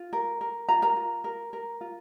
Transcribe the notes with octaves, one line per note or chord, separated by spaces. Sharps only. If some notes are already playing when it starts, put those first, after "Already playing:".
Already playing: F4
A#4
A#4
F4 A#5
A#4 A#5
F4
A#4
A#4
F4